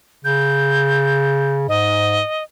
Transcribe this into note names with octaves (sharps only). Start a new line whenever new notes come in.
C#3 G6
G#2 D#5